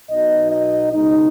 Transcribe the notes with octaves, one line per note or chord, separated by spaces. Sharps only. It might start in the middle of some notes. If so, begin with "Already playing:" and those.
B1 B2 F#3 D#4 D#5
D#5
C#2 B2 G#3 D#4